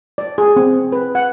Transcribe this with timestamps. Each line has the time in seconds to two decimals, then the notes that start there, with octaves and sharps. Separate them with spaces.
0.18 D5
0.38 G#4
0.56 C4
0.92 B4
1.15 F#5